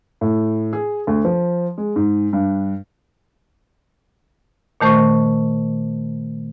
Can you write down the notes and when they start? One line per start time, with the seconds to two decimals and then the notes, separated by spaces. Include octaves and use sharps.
0.21 A2
0.73 G#4
1.07 D2
1.25 F3
1.78 G#3
1.96 G#2
2.33 G2
4.81 A#2 D#3 A3 C5 C#6